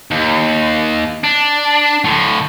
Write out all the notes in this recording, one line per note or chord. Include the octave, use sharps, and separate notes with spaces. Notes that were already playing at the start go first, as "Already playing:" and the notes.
D#2
D4
A2 D3